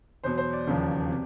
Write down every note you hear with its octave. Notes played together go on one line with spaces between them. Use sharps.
E2 B2 F#3 C5
C5
D5
E1 D#2 C#3 F3
C3